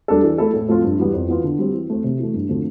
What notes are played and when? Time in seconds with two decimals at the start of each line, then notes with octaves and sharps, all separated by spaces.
0.08 G3 D4 A4
0.23 E3
0.38 A3 E4 A4
0.53 A2
0.68 F3 A3 C4 F4
0.84 G2
0.99 E3 G3 B3
1.14 F2
1.28 E3 B3 F4
1.44 D3
1.59 G3 C4
1.74 E3
1.90 A3 C4
2.04 C3
2.19 E3 A3
2.34 G2
2.49 D3 F3 A3 C4